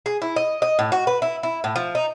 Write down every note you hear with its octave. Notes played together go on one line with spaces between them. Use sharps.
G#4
E4
D#5
D#5
A2
F#4
B4
E4
E4
A2
F3
D#4